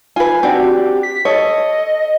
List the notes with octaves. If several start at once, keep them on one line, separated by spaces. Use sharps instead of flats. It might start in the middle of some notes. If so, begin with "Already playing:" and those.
F4 B4 G#5
C4 D4 F#4 G4
B6
A4 C#5 D#5